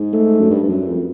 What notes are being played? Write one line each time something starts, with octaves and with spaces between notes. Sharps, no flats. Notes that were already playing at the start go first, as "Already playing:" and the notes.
Already playing: G#2
A3
F#2
G2
G2
F#2
F2